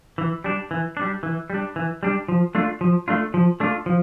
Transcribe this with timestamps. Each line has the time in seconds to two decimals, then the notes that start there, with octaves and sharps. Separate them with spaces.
0.18 E3
0.44 G3 D4
0.71 E3
0.97 G3 D4
1.23 E3
1.50 G3 D4
1.76 E3
2.03 G3 D4
2.28 F3
2.55 A3 D4 F4
2.81 F3
3.08 A3 D4 F4
3.34 F3
3.60 A3 D4 F4
3.86 F3